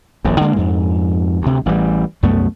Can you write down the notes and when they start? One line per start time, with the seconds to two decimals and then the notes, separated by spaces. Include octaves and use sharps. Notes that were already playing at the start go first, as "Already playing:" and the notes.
0.25 D#1 A#1 F#2
0.41 D3 G#3 A#3
0.56 F2 G#2
1.42 D2 C3
1.66 A1 E3 G3
2.23 C2 F#2 A3 B3